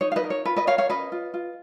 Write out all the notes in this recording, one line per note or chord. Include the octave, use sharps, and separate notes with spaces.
D#4 C#5
F5
B4 D#5
A#4
C#5
F4 B4
B4 D#5
A#4 C#5 F5
C#5 F5
C#4 B4 D#5
F4
F4